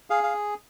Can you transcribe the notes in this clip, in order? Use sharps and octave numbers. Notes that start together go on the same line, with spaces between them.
G#4 F5
F5